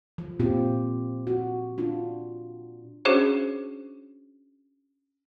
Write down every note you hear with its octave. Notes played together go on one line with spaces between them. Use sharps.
F3
A#2 C4 F4 G4
F#4
D4 F4
C#4 D4 F#4 G#4 C5 C#5